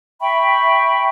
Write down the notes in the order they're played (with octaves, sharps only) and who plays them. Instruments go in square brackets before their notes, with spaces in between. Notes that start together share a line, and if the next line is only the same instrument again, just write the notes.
[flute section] E5 G5 B5 C#6